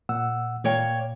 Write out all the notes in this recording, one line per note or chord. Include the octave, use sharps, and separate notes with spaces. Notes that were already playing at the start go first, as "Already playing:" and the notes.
A#2 F#5 E6
A#2 A#3 C#5 G5